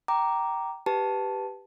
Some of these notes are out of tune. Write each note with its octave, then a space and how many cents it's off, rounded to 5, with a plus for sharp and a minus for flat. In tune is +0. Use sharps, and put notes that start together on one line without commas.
G5 -20 A#5 +0 D6 +0
G4 +0 B4 +0 A5 +0